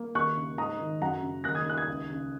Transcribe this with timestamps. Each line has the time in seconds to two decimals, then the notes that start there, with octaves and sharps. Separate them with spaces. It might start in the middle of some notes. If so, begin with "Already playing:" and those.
Already playing: A#3
0.15 D#2 C#6 F#6
0.37 C#3
0.58 G#2 A#5 D#6
0.79 D#3
1.01 F#2 F#5 A#5
1.23 C#3
1.44 D#2 F#6 A#6
1.55 D#6 G#6
1.66 D#3 F#6
1.77 D#6 G#6
1.88 C#2
2.10 C#3